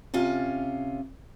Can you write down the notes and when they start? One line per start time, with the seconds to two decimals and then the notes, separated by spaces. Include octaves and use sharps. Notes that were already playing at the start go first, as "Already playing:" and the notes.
0.14 C3 C#4 F4